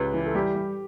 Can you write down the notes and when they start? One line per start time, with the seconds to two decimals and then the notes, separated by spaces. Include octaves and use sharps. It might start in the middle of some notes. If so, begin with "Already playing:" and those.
Already playing: C#2 G4 B4
0.14 E3
0.26 A4
0.35 G3 G4
0.55 G3